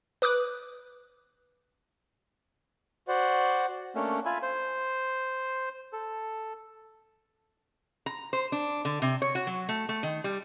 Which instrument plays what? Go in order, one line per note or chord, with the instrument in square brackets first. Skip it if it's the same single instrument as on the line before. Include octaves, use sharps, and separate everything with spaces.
[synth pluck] B4 D6 D#6 F#6
[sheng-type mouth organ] F#4 C5 D5 F#5
[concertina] A3 A#3 C#4 D4
F4 E5 G#5 B5
C5
A4
[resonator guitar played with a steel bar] A#5
C5
D4
D3
C3
C#5
F#4
F#3
A3
A3
D#3
G3